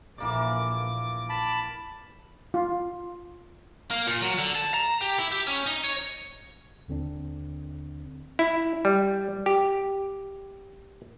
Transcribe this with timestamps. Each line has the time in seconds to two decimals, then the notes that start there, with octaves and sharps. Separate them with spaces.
0.18 A#1 E3 A#3 D5 D6
1.29 A5 B5
2.54 F4
3.91 A#3
4.07 A#2
4.22 F#3
4.38 D3
4.55 A5
4.74 A#5
5.01 G4
5.18 E4
5.31 G4
5.47 C#4
5.66 D#4
5.84 C#5
6.88 D#2 D3 C4 D4
8.39 E4
8.85 G3
9.46 G4